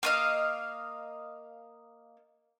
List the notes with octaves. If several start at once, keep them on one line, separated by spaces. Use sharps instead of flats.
A#3 D#5 F5